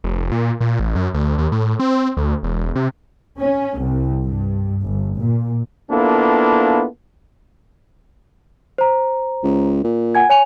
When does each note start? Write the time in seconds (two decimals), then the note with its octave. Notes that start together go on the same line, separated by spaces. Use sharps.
0.04 F1
0.32 A#2
0.60 A#2
0.80 A1
0.96 F#2
1.14 D2
1.38 D#2
1.52 A2
1.80 C4
2.17 D2
2.43 E1
2.75 C3
3.39 C#4
3.79 C2
4.24 G2
4.83 G1
5.18 A#2
5.91 A#3 B3 D4 E4 F4 A4
8.78 C5 A#5
9.44 C#2
9.84 A#2
10.15 F#5 G#5 G#6
10.29 C#5 G#5 F7